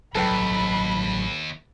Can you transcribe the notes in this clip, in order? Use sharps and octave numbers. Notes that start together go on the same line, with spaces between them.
A1 D#2 F#3 G3 A4 B4 G5 B5